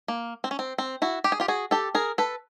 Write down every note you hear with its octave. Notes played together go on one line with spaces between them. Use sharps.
A#3
C4
C#4
C4
C4
E4 F#4
G4
G#4
F4 G4
F#4 G#4
G4 A4
G#4 A#4
A4 B4